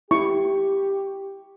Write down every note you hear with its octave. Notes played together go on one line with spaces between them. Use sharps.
E4 G4 C#6